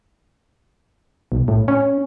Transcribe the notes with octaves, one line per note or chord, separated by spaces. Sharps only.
B1
A2
C#4